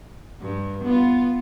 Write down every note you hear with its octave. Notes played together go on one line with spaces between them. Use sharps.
G2
B3 F4